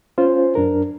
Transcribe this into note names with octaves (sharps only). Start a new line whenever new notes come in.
C#4 F4 C5
F#2 D4 A#4